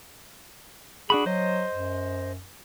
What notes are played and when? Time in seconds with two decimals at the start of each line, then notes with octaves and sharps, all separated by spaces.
1.10 D4 F#4 G#4 B5
1.26 F#3 C5 D#5
1.71 F#2